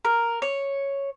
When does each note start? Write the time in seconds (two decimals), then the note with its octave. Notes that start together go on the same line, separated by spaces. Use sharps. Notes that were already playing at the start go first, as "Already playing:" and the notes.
0.05 A#4
0.42 C#5